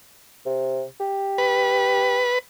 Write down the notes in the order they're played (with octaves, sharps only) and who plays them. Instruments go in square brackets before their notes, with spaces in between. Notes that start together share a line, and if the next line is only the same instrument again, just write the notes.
[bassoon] C3
G4
[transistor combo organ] B4